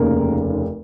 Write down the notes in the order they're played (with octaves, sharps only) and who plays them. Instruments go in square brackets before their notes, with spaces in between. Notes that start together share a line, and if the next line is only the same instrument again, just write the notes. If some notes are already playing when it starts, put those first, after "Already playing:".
Already playing: [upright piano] F1 D#2 C#3 A#3 A#4